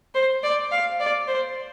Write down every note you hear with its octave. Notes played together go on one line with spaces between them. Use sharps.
C5
D5
F5
D5
C5